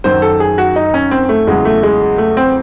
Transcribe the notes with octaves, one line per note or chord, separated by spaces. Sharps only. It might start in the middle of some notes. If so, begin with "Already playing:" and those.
F#2 D#3 F#3 C5
A4
G#4
F#4
D#4
C#4
C4
A3
E2 C#3 F#3 G#3
A3
G#3
A3
C4